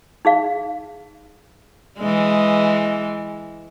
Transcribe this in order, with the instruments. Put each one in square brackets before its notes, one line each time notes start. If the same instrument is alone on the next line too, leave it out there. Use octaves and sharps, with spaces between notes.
[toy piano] D#4 G#4 F5
[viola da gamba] E3 G#3